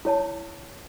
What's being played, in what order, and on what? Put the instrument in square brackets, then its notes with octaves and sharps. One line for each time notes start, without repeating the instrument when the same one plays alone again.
[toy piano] E4 C#5 A5